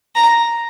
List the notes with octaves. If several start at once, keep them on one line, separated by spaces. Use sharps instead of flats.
A#5